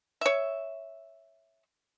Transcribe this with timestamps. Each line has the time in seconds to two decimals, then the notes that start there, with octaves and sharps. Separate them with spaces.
0.21 C#5 E5